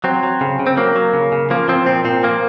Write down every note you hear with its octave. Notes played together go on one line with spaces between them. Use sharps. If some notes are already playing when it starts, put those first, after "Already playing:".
F#3 C4
F#3
C#3
C#3
C4
F#3 A#3
F#3
C#3
C#3
F3 A#3
F3 C4
A#2 C4
A#2 C4
F3 A#3